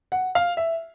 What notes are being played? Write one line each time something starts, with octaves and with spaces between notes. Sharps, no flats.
F#5
F5
E5